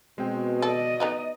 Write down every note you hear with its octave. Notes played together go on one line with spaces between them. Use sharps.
B2 G#3 C4 G5
A4 D5 D#5
B3 D#4 F#4